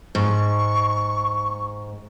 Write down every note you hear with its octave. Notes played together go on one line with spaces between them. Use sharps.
G#2 C#6